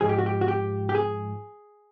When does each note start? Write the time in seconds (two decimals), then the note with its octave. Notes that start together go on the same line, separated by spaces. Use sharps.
0.01 G#2 F3 G#4
0.09 G4
0.18 F#4
0.26 G4
0.41 F#4
0.48 G4
0.89 G4
0.95 G#4